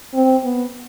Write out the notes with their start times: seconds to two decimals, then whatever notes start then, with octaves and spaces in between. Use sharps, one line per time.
0.14 C4
0.44 B3